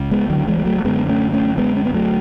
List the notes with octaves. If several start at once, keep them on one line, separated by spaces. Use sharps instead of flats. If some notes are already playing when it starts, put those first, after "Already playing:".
Already playing: C#2
G#3 B3
D3 F#3
E3 G#3
G#3
F#3 A3
A3
F#2 D3 G#3 B3
A3 C#4
A3 C#4
G#3 B3
C#4
B3
F#3 A3